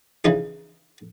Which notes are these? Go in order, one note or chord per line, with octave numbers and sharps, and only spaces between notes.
C#3 E3 D#4 G#4